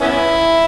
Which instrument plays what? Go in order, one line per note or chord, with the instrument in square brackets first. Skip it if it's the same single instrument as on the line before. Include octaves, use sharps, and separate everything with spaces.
[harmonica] B3 C#4 E4